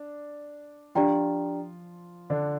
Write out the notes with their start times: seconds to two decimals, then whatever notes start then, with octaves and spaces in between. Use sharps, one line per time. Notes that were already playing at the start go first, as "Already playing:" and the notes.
Already playing: D4
0.95 F3 D4 F4 G4 D5 G5 A#5
2.30 D3 D4